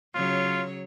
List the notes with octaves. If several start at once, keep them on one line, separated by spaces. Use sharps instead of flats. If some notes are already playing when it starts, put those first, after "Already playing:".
C#3 F#3 F4 C#5